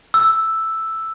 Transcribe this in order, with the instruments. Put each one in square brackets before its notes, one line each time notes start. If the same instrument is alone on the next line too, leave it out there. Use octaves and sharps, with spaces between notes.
[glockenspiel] E6